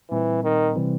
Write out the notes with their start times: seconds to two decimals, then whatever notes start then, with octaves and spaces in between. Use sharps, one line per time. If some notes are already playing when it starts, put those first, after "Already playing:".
0.11 A#2 E3 G3 C4
0.43 D#3
0.75 C3 E3 G3 C4